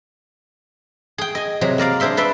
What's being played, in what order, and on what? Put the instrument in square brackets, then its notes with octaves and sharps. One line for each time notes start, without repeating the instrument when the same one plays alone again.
[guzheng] G#4 G5
D#5 G#5
C3 F#3 G#4
A#3 A#4 D5 F5
D4 G#4 C5 E5 C6
B4 D5 E5 C6